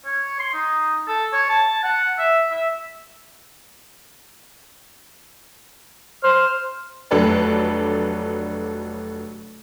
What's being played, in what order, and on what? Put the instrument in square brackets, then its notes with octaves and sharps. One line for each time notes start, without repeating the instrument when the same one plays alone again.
[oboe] C#5
C6
D#4
A4
C#5
A5
F#5
E5
E5
[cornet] C5 [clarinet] F6
[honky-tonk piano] F1 F#3 D4 A4 B4 D5